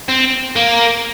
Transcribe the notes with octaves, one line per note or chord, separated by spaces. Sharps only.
C4
A#3